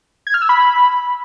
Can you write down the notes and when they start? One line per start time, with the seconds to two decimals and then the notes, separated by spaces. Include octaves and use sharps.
0.27 G#6
0.34 F6
0.42 E6
0.49 B5